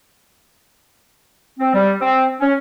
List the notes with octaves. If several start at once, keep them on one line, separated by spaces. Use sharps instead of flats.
C4
G3
C4
C#4